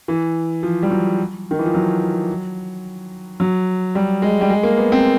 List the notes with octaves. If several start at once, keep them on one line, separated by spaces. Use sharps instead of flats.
E3
F3
G3
F#3
D#3
E3
F3
F#3
F#3
G3
G#3
G3
G#3
A#3
B3
C4